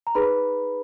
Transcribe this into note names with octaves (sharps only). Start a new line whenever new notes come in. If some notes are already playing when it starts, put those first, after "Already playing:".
A#5
D#4 G#4 B4 B5